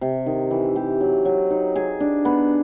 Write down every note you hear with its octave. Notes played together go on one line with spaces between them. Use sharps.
C3
D#3
E3
G4
F#3
F#3
D#4
G#4
D4
B3